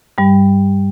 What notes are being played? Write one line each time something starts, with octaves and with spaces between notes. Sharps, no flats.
G2 G3